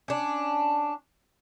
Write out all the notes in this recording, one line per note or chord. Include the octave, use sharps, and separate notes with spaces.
C#4 D4